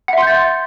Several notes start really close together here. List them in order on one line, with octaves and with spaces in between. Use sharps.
F#5 E5 C6 G6 A6